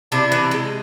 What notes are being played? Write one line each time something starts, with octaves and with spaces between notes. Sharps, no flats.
C3 D4 E4
E3
G#3